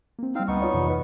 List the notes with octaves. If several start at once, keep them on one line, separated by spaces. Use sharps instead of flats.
A#3 C4
G3 C4 D#4 F5
D2 B3 D#4 C#6
F4 C#5 D5
F2 C3 E3
B4